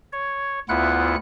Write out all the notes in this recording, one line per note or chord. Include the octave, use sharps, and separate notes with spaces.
C#5
D2 B3 E4 F4 F#5 F#6